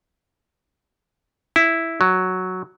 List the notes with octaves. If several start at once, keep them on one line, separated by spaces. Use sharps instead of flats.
E4
F#3